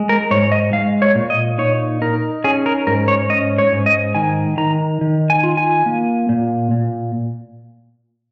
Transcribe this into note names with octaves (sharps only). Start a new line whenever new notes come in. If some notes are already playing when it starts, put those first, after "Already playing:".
Already playing: G#3
A#4
G#2 C#5
D#5
G#3 F5
C#5
A#2
D#5
D#4 C#5
D#4 A#4
C#4 G#4
A#4
G#2 A#4
C#5
C#4 D#5
C#5
G#2
D#5
D#3 G#5
D#3 A#5
D#3
G#5
F4
G#5
A#3
A#2
A#2